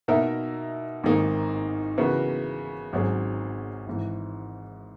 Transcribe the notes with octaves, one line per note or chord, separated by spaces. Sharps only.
B2 A#3 D#4 A#4 E5
G#1 G#2 D#3 A#3 D#4
C#3 E3 B3 F#4 A#4
G#1 G#2 F#3 C#4 G#4
G#1 G#2 E3